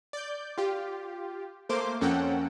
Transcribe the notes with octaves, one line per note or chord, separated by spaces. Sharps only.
D5 G6
F4 G4
A3 A#3 C5 C6 D6
F2 A#3 C#4 A4 F#5 G5